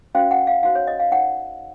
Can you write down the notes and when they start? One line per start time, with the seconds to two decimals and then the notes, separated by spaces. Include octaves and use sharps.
0.15 C#4 F#4 C5 F5
0.31 F#5
0.47 F5
0.63 D#4 F#4 C5 F5
0.75 C#5
0.87 D#5
1.00 F5
1.12 D#4 A#4 C#5 F#5